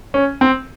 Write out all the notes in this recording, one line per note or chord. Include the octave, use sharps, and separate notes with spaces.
C#4
C4